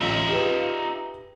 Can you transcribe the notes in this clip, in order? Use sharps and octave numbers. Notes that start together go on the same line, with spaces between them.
A1 D#4 F4 E5
G4 G#4 B4